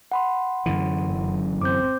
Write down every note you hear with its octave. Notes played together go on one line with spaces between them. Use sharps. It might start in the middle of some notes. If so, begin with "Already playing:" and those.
F#5 B5 C6
F#2 D3 E3
F#1
C4 D6 G6